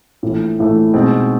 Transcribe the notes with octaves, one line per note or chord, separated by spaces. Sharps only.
A#1 A2 E3 A3
A#1 A2 E3 A3
B2 G#3 C4 D#4